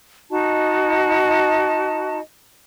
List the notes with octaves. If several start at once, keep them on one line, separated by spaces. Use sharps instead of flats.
D#4 F#4 D#5 A5